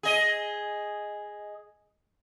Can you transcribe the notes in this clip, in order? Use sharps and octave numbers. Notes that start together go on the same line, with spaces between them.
G#4 D#5